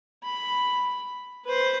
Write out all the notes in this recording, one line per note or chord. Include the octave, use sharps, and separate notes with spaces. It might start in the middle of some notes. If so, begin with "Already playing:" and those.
B5
B4 C5